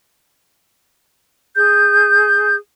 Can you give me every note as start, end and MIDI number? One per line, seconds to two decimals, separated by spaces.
1.57 2.56 68
1.57 2.56 91